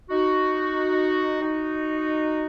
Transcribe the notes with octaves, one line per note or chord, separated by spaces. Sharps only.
D#4 F#4
D#4 F#4